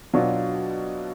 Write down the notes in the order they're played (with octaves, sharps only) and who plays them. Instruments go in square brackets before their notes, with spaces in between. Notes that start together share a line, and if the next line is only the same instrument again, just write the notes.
[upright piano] B2 F#3 D4 F4